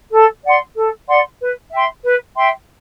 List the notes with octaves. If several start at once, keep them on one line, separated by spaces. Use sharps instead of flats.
A4
D5 F#5 C6
A4
D5 F#5 C6
B4
E5 G5 C6
B4
E5 G5 C6